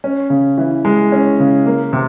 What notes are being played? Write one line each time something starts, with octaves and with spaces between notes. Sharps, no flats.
C#4
C#3
E3
G#3
C#4
C#3
A#3
C3